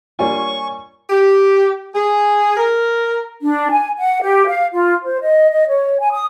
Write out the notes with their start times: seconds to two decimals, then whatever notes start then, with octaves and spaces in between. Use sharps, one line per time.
0.19 G3 A#3 D4 F4 C#5 G#5 C#6
1.09 G4
1.95 G#4
2.57 A#4
3.42 D4
3.70 G#5
3.97 F#5
4.21 G4
4.47 F5
4.72 F4
5.04 C5
5.21 D#5
5.51 D#5
5.67 C#5
5.99 G#5
6.12 D#6